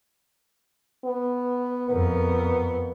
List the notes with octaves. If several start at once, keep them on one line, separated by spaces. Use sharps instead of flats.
B3
F2 B3 A#4